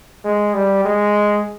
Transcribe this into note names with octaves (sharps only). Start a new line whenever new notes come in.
G#3
G3
G#3